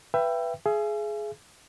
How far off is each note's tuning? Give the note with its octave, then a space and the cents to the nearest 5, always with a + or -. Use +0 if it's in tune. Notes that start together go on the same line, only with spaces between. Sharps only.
B4 +0 E5 +25 G5 +0
G#4 +20 E5 +45